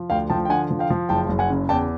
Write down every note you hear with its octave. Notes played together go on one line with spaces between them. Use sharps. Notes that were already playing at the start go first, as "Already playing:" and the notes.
Already playing: F3
D2 F5 G5
F3 G5 A5
G5
D3 F#5 G#5
F3
F5 G5
F3
F#1 G5 A5
F#1
F#5 G#5
C#3
E2 G5 A5